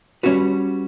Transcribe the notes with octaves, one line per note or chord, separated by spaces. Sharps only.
G3 C#4 F#4 B4